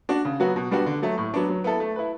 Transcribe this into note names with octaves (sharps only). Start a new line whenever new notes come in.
D4 F#4
C#3
F#3 B3 F#4
B2
G3 B3 D4 F#4
D3
F#3 A3
A2
F#3 B3 D4
F#3
B3 E4 A4
A3
E4 B4